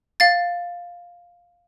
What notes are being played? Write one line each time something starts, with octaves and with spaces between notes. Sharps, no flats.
F5 A6